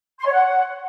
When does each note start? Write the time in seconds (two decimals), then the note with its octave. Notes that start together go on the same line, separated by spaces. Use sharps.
0.19 C6
0.26 C#5
0.32 F#5